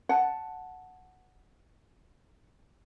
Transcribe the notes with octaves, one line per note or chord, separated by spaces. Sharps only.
F#5 A5